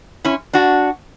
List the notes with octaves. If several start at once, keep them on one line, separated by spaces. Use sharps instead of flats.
C#4 E4
D4 F#4